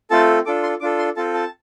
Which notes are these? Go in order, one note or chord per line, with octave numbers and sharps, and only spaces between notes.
A3 C4 F4 A4 A5
D4 F4 A4 D6
C6
D4 F4 A4 D6
C6
C4 F4 A4 A5
A5